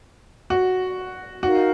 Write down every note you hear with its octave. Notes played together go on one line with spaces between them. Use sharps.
F#4
D#4 F#4 A#4 F5